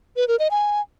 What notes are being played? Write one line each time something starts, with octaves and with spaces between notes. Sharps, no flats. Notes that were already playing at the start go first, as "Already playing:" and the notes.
B4
A#4
D#5
G#5